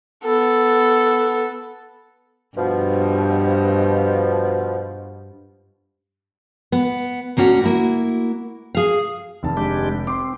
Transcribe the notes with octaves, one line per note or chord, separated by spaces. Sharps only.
B3 A4
G2 B2 F3
B3
D2 A#3 C#4 F#4
A#3 E4 F#4
G#4 F5
F1 D#3 A5
G#3 D4 G4
C4 C6 D6